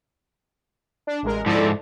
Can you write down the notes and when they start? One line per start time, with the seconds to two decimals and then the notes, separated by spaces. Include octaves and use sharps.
1.07 D4
1.23 A1 G#3 A#4
1.46 G#2 F3 E4 A4 D5